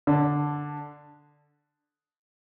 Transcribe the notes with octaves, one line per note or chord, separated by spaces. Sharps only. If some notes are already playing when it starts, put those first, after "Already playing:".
D3 D4